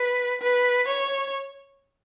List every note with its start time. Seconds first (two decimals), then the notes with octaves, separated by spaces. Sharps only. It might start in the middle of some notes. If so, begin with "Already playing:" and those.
Already playing: B4
0.41 B4
0.88 C#5